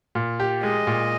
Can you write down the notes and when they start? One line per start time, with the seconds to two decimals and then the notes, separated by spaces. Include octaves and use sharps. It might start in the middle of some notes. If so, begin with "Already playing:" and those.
0.15 A#2
0.40 G4
0.63 G#3 D#5
0.87 A#2